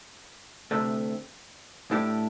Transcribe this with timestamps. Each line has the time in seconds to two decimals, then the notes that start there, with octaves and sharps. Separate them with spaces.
0.71 D2 C3 A3 D4
1.91 A2 A3 D4 G4